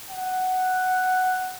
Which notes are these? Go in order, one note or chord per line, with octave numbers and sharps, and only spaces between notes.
F#5